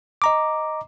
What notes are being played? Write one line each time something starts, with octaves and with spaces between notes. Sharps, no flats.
D#5 A#5 D6